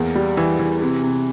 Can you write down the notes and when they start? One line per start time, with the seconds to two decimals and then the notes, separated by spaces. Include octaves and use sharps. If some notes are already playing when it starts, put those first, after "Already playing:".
Already playing: E2 A#3
0.15 G3
0.37 E3
0.59 E3
0.82 C3
1.03 C3